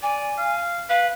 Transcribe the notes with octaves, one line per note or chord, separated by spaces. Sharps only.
D5 G#5
F5
B4 F5